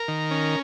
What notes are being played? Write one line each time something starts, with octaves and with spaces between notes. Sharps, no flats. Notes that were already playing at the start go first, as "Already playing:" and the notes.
Already playing: A#4
D#3
C#4